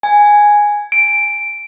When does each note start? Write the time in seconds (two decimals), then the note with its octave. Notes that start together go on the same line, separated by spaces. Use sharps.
0.03 G#5
0.92 D7